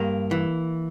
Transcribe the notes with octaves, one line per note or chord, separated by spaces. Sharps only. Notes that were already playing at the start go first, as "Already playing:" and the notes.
Already playing: G2 A#3
E3